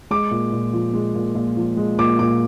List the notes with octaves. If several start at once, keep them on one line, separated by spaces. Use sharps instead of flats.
G#3 D6
A#2
A#2
F3
G#3
A#2
A#2
F3
G#3
A#2 D6
A#2 D6